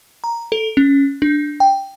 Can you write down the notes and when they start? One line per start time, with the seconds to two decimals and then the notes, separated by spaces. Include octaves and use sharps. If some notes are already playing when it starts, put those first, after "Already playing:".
0.24 A#5
0.52 A4
0.77 C#4
1.22 D4
1.60 G5